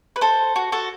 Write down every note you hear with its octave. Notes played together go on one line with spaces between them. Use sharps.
B4
A4 C5
F#4
F#4 A4